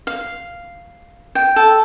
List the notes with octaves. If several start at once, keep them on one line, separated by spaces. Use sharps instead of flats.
F5
G5
A4